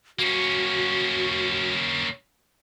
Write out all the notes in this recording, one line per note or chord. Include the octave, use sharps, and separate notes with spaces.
A#3 C#4 F#4